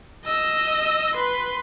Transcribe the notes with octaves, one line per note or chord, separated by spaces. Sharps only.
D#5 E6
B4 C6